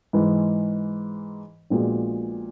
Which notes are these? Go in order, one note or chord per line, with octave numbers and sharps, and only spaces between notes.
G#2 E3 G#3
A#1 A#2 G#3 B3 F#4